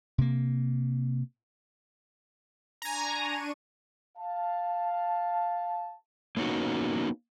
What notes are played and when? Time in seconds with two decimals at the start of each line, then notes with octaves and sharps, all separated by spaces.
0.18 C3 A#3
2.82 D4 G#5 A#5 C#6 D#7
4.17 F5 A5
6.37 A#3 B3 C#4 D#4 F#4